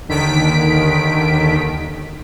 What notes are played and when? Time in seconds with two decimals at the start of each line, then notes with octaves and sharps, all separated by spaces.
0.09 D#2 D3 D#3 B6 D7